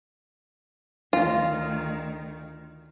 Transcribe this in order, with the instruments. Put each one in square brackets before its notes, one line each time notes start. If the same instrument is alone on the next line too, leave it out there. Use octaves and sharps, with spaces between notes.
[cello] D2 D#3 [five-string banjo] F4